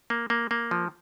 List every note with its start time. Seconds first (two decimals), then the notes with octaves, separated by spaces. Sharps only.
0.10 A#3
0.30 A#3
0.51 A#3
0.71 F3